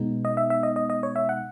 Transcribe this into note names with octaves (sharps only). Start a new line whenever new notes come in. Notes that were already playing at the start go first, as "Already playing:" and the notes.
Already playing: B2 G#3 B3 D#4
D#5
E5
E5
D#5
D#5
D#5
C#5
E5
F#5